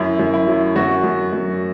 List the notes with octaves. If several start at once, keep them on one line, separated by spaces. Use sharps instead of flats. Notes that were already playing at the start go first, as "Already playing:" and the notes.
Already playing: F#2 E4
F#2
E4
F#3
F#2 F#4
F#2
F#2